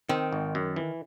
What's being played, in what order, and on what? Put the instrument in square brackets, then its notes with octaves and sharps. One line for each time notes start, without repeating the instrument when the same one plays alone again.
[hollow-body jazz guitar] D#3 [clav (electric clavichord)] C4
[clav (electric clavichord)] G#1
F#2
E3